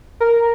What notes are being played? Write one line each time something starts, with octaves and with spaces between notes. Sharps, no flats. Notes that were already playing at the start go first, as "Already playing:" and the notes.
A#4